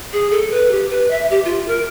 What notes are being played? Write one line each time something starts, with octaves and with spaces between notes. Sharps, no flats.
G#4
A4
B4
G4
B4
E5
G4
F4
A#4